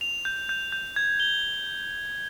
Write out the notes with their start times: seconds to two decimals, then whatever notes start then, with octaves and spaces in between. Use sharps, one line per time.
0.01 F7
0.25 G6
0.49 G6
0.72 G6
0.96 G#6
1.20 G7